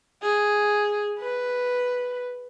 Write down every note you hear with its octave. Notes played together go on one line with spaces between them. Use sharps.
G#4
B4